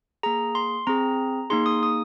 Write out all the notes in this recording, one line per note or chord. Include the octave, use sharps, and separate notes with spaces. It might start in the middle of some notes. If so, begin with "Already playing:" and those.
A#3 G#4 A#5
C6
C4 G#4 A#5
A#3 D#4 G#4 C6
D#6
D#6